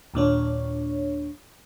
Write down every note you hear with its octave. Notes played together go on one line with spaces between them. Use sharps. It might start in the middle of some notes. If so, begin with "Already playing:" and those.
D#2 A#2 D4 C#5